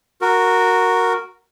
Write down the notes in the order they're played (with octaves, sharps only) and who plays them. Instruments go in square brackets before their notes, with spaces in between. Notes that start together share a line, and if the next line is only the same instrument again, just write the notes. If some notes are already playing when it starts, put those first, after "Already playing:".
[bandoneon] F#4 A#4